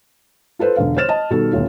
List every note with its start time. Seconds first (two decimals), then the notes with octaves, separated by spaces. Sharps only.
0.59 F4 A4 B4 C5
0.76 E1 D3 F5
0.97 C5 C#5 F6 A6 E7
1.09 D#5 A5
1.30 B2 D#3 G3 A4
1.52 D#1 D2 B3 F4 C#5